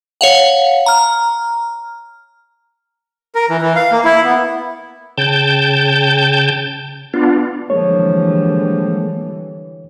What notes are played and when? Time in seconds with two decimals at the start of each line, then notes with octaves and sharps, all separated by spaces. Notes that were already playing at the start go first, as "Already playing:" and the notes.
0.21 C#5 F5 F#5
0.86 A#5 F6
3.35 A#4
3.49 E3
3.62 E3
3.76 F5
3.92 A#3
4.04 E4
4.25 B3
5.18 C#3 G5 A5 G6
7.14 B3 D4 F4
7.70 D3 E3 F3 G3 G#3 A#3 C#5